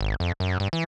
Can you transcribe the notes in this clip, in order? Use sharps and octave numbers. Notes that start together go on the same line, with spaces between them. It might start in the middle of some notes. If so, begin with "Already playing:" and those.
G#1
F2
F#2
G2
E3